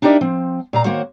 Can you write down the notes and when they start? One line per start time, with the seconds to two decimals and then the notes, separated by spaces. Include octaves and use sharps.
0.02 D4 D#4 G4 A#4 D5 E5
0.21 F3 C4
0.73 A#2 F5 A#5
0.85 D#3 A#3 F#4 C5 C#5